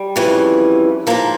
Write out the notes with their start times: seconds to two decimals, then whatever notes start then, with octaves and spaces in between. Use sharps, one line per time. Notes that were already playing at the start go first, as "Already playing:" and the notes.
Already playing: G3
0.16 F2 C#3 E3
1.07 G#2 F3 A#3